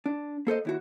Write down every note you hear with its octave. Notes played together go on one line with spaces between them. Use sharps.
D4
A#3 A4 C5 D#5
D#2 E4 F#4